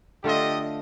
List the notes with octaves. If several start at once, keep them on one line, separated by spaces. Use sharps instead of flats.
D3 A3 F4 G4 A4 D#5